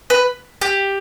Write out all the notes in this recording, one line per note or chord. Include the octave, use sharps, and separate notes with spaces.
B4
G4